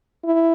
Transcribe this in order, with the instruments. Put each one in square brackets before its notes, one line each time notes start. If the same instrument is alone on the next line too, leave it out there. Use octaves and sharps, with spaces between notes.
[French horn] E4